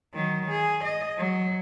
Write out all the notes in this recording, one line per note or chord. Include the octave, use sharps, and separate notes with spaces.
D#3 F#3
G#4
D#5
F#3